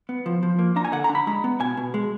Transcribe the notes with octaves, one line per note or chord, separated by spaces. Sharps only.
B3
F3
F3
A#3
D4 A#5
G#5
D3 F#5
A#5
D4
B5
G#3 A#5
B3
B2 G#5
B2
G#3